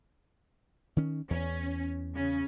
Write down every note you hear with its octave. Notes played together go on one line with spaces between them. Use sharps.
D#3 C#4
E2 C#4
C#3 C#4